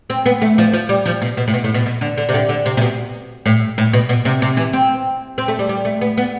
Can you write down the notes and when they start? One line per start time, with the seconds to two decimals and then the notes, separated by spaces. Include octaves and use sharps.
0.10 C4
0.26 B3
0.42 A3
0.58 F3
0.73 F3
0.89 G3
1.06 F3
1.22 B2
1.37 B2
1.48 A2
1.54 B2
1.64 A2
1.74 B2
1.86 B2
2.01 D3
2.18 D3
2.29 C3
2.34 D3
2.49 D3
2.66 C3
2.77 C3
2.81 B2
3.46 A2
3.78 A2
3.93 B2
4.09 B2
4.25 C3
4.42 C3
4.57 E3
4.73 C4
5.38 C4
5.48 A3
5.59 G3
5.69 G3
5.85 A3
6.01 B3
6.17 B3